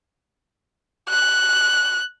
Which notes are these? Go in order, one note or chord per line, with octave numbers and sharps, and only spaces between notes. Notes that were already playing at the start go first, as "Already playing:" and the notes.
F#6